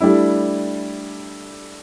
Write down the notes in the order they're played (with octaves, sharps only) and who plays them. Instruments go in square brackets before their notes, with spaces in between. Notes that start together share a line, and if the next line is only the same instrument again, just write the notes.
[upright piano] G3 A3 D4 E4